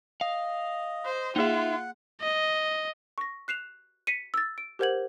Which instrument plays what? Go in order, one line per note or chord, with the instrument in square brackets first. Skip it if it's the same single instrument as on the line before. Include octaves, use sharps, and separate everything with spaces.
[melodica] D#5 [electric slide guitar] F5
[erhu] C5
[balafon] A#3 G#4 [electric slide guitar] D#4 E5 [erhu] F4 [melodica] F#5
[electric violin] D#5
[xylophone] C#6 A#6
F#6 C7 E7 F7
B6 C#7 D#7
E6 A6
D7
G4 A#4 C5 F#5 G#6 F#7